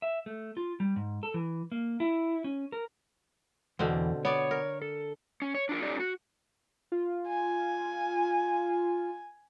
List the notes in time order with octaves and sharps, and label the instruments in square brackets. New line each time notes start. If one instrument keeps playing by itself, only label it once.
[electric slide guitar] E5
A3
F4
G3
G#2
A4
E3
A#3
E4
C#4
A#4
[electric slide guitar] E2 [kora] B2 D3 C4
[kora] B3 D5 [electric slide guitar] C#5
[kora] A#4
[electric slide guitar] A4
C#4
C#5
D4 F4 A#4
C#4 D#4 G4 A4 D5
F#4
[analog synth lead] F4
[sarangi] G#5